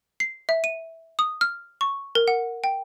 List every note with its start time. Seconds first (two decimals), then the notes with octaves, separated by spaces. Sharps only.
0.20 C7
0.49 E5
0.64 D#7
1.19 D#6
1.41 F6
1.81 C#6
2.15 A#4
2.28 F#5
2.64 G5